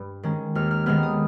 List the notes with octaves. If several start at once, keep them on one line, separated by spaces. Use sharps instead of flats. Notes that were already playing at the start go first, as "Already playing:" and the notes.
Already playing: G2
D#3 G#3 C#4
D#2 F6
F6
D#3 G#3 B3 F6
D#6